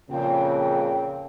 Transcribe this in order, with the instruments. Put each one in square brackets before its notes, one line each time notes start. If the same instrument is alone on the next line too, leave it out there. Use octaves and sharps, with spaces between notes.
[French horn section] F2 A#2 C#3 [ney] G5